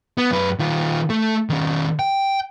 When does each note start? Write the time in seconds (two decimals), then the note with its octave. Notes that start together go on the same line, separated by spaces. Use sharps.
0.18 B3
0.31 F#2 B4
0.59 D#3 F4
1.10 A3 A4
1.50 D#3 C#4
1.99 G5